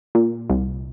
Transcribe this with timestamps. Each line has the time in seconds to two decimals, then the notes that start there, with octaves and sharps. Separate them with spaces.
0.15 A#2
0.50 C2